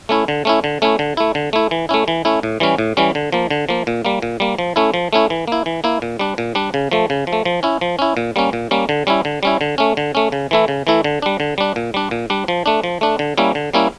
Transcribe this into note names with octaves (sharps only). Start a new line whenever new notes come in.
A3 C#4 E4
D3
A3 C#4 E4
D3
A3 C#4 E4
D3
A3 E4
D3
A3 E4
E3
A3 C#4 E4
E3
A3 C#4 E4
A2
E3 G3 C#4
A2
E3 G3 C#4
D3
F3 A#3
D3
F3 A#3
A#2
G3 A#3
A#2
G3 A#3
F3
A3 C#4 E4
F3
A3 C#4 E4
E3
A#3 E4
E3
A#3 E4
A#2
G3 D4
A#2
G3 D4
C#3
F3 A3
C#3
F3
A3
F3
C#4 E4
F3
C#4 E4
A#2
G3 A#3 C#4
A#2
G3 A#3 C#4
D3
G3 C#4 E4
D3
G3 C#4 E4
D3
A3 C#4
D3
A3 C#4
C#3
E3 A3 E4
C#3
E3 A3 E4
D3
G3 D4
D3
G3 D4
A#2
G3 D4
A#2
G3 D4
F3
A3 D4
F3
A3 D4
D3
G3 A#3 C#4 E4
D3
G3 A#3 C#4 E4